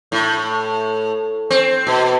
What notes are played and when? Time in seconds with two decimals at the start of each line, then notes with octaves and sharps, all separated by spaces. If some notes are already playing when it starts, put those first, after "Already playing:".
0.12 A2
1.50 C4
1.87 B2